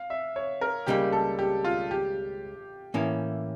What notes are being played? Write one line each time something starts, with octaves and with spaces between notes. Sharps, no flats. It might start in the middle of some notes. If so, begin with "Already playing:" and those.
Already playing: F5
E5
C#5
A#4
C#2 C#3 G3 A#3 G4
A4
G4
F4
G4
A2 E3 A#3 C#4 E4